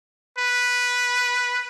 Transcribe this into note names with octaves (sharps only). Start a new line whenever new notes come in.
B4